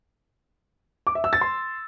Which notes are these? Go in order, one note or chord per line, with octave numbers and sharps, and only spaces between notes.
D6
E5
E6
A6
C6